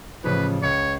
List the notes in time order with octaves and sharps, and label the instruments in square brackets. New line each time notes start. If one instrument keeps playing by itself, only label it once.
[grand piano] A1 C#3 F3 [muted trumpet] B4
[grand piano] C#2 C#7 [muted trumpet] C#5